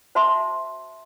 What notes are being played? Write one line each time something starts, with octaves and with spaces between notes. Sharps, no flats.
F#4 C5 E5 A5 C6